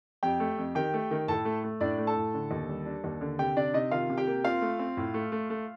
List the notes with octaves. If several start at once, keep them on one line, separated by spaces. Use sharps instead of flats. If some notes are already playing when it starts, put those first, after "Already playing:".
F2 G4 G5
A3
F2
D#3 G4 G5
A3
D#3
A2 A4 A5
A3
A3
A2 D4 D5
A3
A4 A5
A2
D3
D#2
G3
D4
D#2
D3
C3 G4 G5
C3 D4 D5
C3 D#4 D#5
D#3 F4 F5
C3
G4 G5
A#3
C4 F4 F5
A3
C4
A2
A3
A3
A3